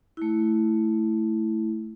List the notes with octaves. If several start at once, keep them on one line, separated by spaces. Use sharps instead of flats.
A3 E4